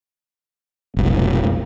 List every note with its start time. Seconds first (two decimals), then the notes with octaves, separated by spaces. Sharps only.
0.97 F1 B1